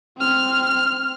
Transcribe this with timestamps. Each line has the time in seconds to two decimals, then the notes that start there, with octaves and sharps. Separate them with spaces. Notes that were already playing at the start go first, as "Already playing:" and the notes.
0.17 C4 F6